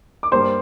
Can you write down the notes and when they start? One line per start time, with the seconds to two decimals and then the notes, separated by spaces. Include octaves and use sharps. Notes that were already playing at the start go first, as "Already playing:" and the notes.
0.23 D6
0.32 G2 G3 A#3 C5 C6